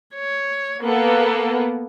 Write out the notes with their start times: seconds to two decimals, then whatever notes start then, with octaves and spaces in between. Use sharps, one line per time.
0.15 C#5
0.83 A#3 B3 A4